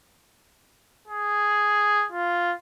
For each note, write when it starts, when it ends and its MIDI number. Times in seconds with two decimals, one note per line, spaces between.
1.08 2.06 68
2.12 2.53 65